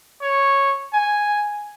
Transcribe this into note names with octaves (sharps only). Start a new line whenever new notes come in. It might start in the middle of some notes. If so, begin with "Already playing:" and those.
C#5
G#5